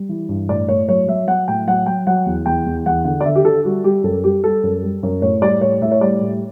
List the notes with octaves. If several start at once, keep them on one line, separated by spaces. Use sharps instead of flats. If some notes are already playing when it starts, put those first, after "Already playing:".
Already playing: G3
E3
G2
A2 D5
A2 C#5
F#3 C#5
F#3 E5
F#3 F#5
A2 G5
F#3 F#5
F#3 G5
F#3 F#5
E2
E2 G5
E2
E2 F#5
D3 F#5
D5
D3 E5
G4
D3 A4
G3 F#4
G3 G4
F#2 A4
G3 G4
G3 A4
F#2
G3
F#2
A2 C#5
G3 D5
A2 C#5
A2 E5
C#5
G3 D5
A2